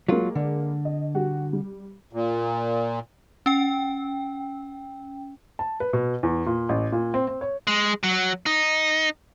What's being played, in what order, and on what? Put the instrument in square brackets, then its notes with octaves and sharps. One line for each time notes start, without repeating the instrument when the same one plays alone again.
[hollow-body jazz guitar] F#3 F4 [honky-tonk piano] G#3 A#3
[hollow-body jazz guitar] D3
[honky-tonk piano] D#5
G3 F#4 G4
G3
[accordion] A#2
[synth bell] C#4 G5
[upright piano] A5
B4
B2
E2
A#2
A1
A#2
C4
C4
C#5
[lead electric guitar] G#3
F#3
D#4